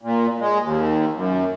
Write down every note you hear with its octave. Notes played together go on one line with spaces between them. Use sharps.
A#2
G#3
D#2
F#2